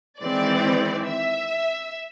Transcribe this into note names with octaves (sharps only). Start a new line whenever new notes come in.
D#3 E3 G#3 C4 D5
E5